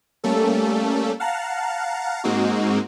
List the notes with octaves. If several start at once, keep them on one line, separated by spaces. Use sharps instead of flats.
G3 A3 A#3 C#4 A4
F5 F#5 A5 A#5
G#2 G#3 A#3 C4 D#4 F#4